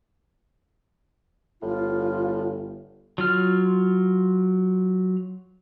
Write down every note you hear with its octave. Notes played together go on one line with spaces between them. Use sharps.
G1 A2 F4
F#3 F4 F6